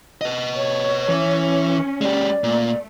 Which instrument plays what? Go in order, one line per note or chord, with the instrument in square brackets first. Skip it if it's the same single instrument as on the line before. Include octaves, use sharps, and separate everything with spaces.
[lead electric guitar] B4 D#5
[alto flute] C#5
[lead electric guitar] E3 [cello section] C#4
[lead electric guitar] G#3 G4 [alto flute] D5
[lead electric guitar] A#2 [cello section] A3